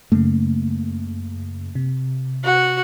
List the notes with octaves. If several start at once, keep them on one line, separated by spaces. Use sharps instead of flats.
F#2 C#3 A3 A#3
C3
F#4 F#5